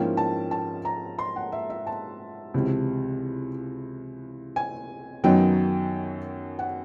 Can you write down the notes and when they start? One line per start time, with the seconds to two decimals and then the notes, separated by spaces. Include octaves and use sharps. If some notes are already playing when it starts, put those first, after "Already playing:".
Already playing: G#2 F3 A#3 C#4 E4 G5
0.17 A5
0.51 A5
0.85 A#5
1.19 C6
1.36 F#5
1.52 E5
1.70 E5
1.87 A5
2.54 C#2 C3 E3
4.56 G#5
5.24 F#2 D#3 F#3 B3 D#4 G5
6.59 F#5